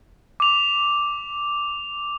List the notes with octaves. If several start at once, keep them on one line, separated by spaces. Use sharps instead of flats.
D6 F7